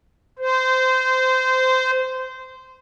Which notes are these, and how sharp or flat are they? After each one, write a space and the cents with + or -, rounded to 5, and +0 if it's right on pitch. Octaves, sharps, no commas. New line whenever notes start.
C5 -20